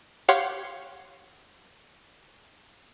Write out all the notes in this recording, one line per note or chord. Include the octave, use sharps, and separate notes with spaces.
G4 C#5 F5 F#5 C6